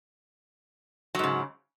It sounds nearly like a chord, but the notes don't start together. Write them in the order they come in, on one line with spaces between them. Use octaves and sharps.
F#3 G#2 C#3